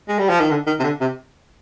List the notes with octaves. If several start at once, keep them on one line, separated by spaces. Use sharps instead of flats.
G#3
G3
F3
D#3
D3
D#3
C3
D3
C3